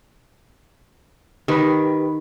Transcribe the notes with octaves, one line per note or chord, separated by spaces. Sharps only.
D#3 G4 B4 B5